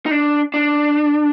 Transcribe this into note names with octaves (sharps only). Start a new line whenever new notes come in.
D#4
D4
D4